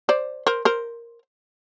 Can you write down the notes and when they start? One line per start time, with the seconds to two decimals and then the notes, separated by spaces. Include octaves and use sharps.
0.09 C5 D5
0.47 A#4 C5
0.65 A#4 C5